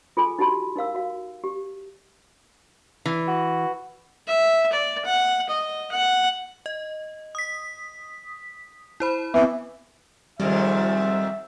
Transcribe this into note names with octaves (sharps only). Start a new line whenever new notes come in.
F4 G#4 A4 G#5 B5 D6
D#4 F#4 G4 A5 B5 C6
D#4 A#4 F5 E6
F#4 F5
G4
E3
F#4
E5
D5
F#5
D#5
F#5
D#5
D#6 B6
E4 C5 B5
E3 B3 C4
F2 G#2 D#3 G3 E5